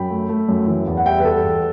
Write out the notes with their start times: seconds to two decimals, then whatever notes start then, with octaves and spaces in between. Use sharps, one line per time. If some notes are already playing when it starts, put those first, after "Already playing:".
Already playing: F#2 G5 B5
0.10 A3
0.29 A3
0.48 F#2
0.67 E3
0.87 E2
0.97 F#5
1.06 G3 E5 G5
1.20 B4
1.25 E2 A4
1.44 E2